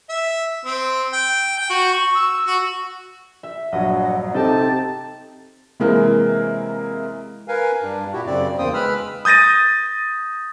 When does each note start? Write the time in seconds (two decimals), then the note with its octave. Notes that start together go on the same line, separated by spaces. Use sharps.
0.09 E5
0.65 C4
1.13 G5
1.57 G5
1.70 F#4
1.92 C#6
2.15 E6
2.47 F#4
3.43 E5
3.72 A#1 G2 F#3 D#5 F#5
4.34 C3 C4 D#4 G4 A4 D#5 G5 A5
5.80 C3 E3 G#3 A#3
7.48 A#4 B4 F5 G#5
7.82 G2 D4
8.13 A#2 E4 F#4 G4
8.26 F#2 C#3 C4 D5
8.58 E2 C#3 A#3 C5 G5 D#6
8.74 G#3 B4 B5 E6 F6
9.25 D#6 G6 A6 A#6 D#7